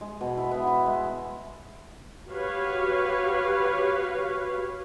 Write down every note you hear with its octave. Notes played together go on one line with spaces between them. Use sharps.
G#3
B2
E4
B3
E4
G#3
F#4 G4 B4 C#5 F5